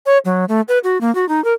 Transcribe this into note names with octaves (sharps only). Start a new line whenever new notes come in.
C#5
F#3
A3
B4
F#4
A#3
F#4
D#4
A#4